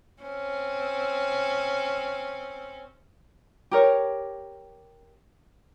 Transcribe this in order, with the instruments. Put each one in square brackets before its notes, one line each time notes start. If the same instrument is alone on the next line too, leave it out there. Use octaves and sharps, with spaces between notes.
[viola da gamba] C4 C#4
[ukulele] G4 A#4 C#5